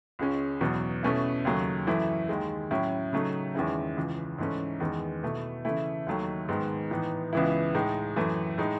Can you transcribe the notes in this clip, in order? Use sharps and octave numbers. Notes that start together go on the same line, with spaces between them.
C#2 C#3 G#3 C#4
E2 B2 F#3
B2 A3 C#4 E4
D#2 C#3 F#3 A3
F#2 E3 A3 E4
D#2 D#3 G#3
A2 F#3 C#4 E4
C#3 F#3 A3 D#4
E2 D#3 G#3 C#4 E4
C#2 C#3 E3
G#2 E3 A3 C#4
E2 D#3 G#3 B3
B2 A3 E4
C#3 E3 A3 E4
D#2 D#3 F#3 A3
G#2 D#3 G#3 B3
A2 E3 B3 D#4
C#2 C#3 E3 B3 E4
A2 G#3 D#4
F#2 E3 A3
A2 G#3 D#4